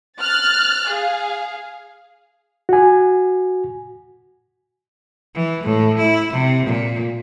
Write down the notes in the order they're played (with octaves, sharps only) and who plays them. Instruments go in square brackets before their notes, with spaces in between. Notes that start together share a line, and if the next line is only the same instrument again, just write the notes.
[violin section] F6 F#6 A6
G#4 F5
[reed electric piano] F#4 G#5
[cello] E3
A2
E4
C3
A#2